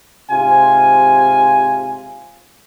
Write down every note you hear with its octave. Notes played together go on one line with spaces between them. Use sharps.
G#2 C3 F4 G#5